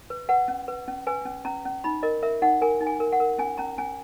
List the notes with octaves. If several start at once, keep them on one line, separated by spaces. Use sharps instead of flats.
B4
B4 F#5
C#4
B4
C#4
B4 G#5
C#4
C#4 A#5
C#4
D#4 B5
A#4 D#5
A#4 E5
D#4 F#5
A#4 G#5
D#4
G#5
A#4
F#5
A#4
C#4 G#5
C#4 A#5
C#4 G#5